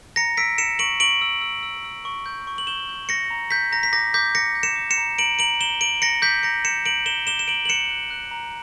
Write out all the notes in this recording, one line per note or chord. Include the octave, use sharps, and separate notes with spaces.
A#5 A#6 C#7
E6 B6 D7
A#5 C#7 E7
C#6 D7 F#7
C#6 D7 F#7
E6
E6
E6
E6
C#6
G6
C#6
F#7
G6 E7 G7
G6
C#6 A#6 C#7
A#5
G6 B6
A#5 A#6
B6
D6 A#6
D6 G6 B6
G6 A#6 C#7
G6
C#7 E7
D6
C#7 E7
A#5
A#5 D7 F#7
A#5 D7 F#7
G6 E7 G7
A#5 D7 F#7
A#5 A#6 C#7
D6 G6 B6
A#5 A#6 C#7
A#5 C#7 E7
A#5 D7 F#7
A#5 E7 G7
D6 E7 G7
E7
A#5 D7 F#7
F#7
F#6 C#7 E7
F#6
F#6
A#5